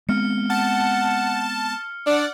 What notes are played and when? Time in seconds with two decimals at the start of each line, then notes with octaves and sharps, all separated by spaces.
0.09 G#3 B3 C4 F6 C#7
0.50 F#5 A5 F6
2.07 D4 D5 F#5